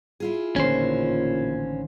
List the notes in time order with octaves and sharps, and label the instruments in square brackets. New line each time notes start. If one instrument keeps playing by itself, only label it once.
[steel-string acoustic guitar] E4 F4 G#4
[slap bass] A1 D3 D#3 [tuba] A#2 [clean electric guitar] C#4 C5